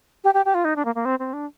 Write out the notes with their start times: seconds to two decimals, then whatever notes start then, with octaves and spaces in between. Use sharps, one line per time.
0.24 G4
0.34 G4
0.46 G4
0.54 F4
0.65 D#4
0.76 D4
0.85 A#3
0.95 A#3
1.05 C4
1.19 C4
1.33 D4